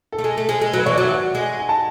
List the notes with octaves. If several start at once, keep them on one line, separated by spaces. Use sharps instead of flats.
A4
A3
G#3
A3
G#3
G#3
F#3 B4
E3 C#5
D5
F#3 E5
F#4 F#5
G#3
G#5
A5